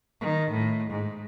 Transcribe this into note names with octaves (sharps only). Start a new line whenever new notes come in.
D#3
A2
G#2